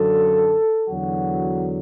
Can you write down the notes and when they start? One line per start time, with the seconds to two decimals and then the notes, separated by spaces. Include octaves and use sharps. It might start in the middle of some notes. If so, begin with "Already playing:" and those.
Already playing: F#2 D3 F#3 A4
0.88 E2 D3 F#3 F#4